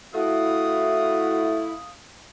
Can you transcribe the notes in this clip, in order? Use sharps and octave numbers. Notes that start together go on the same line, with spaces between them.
A3 E4 F#4 F5 D#6